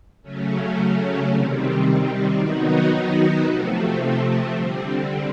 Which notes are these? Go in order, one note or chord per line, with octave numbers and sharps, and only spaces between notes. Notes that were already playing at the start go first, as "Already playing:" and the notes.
C#3 F#3 A3 C#4
C3 D#3 G3 C4
D#3 F#3 B3 D#4 F#4
C3 F3 A3 C4
D3 G3 C4